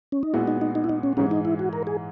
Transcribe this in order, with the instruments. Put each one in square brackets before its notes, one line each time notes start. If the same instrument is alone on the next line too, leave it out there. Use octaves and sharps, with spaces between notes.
[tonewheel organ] C#4
D#4
[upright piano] A#2 G#3 B3 F#4 [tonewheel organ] E4
[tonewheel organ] D#4
D#4
D#4
E4
D#4
C#4
[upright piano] G#2 E3 G#3 [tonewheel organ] C#4
[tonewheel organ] D#4
E4
F#4
A#4
G#4